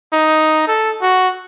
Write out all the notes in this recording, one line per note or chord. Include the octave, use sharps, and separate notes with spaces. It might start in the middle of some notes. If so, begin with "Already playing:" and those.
D#4
A4
F#4